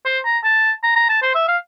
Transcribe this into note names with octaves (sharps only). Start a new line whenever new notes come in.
C5
A#5
A5
A#5
A#5
A5
C5
E5
F5